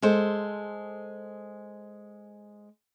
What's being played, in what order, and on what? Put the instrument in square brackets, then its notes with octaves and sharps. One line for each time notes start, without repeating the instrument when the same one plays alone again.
[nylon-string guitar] G#3 A4 C5